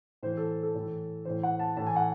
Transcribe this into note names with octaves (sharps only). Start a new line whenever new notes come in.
A2 E3 C5
A4
A4
A2 E3
A2 E3 C5
F#5
A5
A2 E3 A5
G#5
F#5